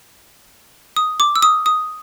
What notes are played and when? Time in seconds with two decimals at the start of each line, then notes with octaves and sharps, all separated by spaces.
0.97 D#6
1.20 D6
1.36 E6
1.42 D#6
1.66 D#6